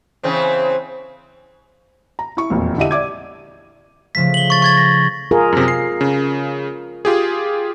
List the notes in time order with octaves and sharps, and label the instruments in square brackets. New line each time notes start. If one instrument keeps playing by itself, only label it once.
[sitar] C#3 E3 C4
[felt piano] A#5
E4 C#6
E1 F2 A#2
D3 E4 G4 D#5 E5 D#7
D5 E5 D6 G#6
[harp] C#3 F3 A3 [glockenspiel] B6
[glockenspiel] F#7 G7
C#6 A6
C#6 G#6 A6
A#6
[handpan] F4 G#4 A#4
[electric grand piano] F#2 C3
C7
C#3
F4 G4 G#4